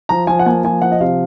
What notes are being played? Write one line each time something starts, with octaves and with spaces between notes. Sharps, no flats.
F3 A#5
F3 G#5
F#5
A#3 G#5
F3 G#5
F3 F#5
D#5
C3 F5